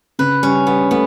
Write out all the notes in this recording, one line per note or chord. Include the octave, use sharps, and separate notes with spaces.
C#3 B4
G3 C#4
G3 B3
A3 B3